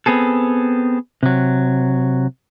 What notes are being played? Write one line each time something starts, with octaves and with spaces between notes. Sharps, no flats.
B3 C4 G#4 A4
C3 F#3